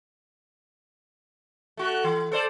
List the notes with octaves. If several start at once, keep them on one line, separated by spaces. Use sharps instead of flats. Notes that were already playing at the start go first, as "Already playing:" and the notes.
A3 F#4
E3
A4 C5 D5